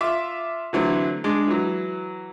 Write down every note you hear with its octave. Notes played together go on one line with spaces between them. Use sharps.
F4 E5 D6
D3 E3 F#3 A3 C4
G#3 D4
E3 F#3